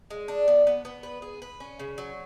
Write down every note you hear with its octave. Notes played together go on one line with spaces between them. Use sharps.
G#3
D4
B3
B3
B3
B4
G#4
B4
C#4
C#3
F#3